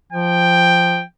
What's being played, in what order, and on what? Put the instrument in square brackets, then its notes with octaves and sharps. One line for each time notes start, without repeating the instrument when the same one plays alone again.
[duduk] F3 [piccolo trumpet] G5